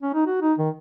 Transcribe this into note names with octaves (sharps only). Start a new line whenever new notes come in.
C#4
D#4
F#4
D#4
D#3